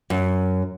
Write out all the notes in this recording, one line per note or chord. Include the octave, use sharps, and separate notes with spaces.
F#2